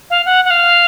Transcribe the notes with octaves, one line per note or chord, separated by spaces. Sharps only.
F5
F#5
F#5
F5